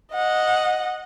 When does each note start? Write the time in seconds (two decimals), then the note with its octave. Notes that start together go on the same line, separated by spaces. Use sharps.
0.14 D#5 F#5